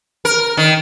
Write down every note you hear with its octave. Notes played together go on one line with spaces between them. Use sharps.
A#4
D#3